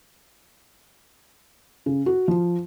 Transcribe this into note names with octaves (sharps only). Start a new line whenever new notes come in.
C#3
F#4
F3